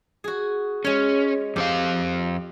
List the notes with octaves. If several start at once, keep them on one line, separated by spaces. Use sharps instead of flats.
F#4 G#4
G#3 C#4 C#5
F2 C4 G4 F5